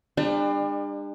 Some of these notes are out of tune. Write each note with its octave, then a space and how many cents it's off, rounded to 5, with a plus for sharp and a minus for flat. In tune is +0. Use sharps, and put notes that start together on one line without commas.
G3 +45 D4 +30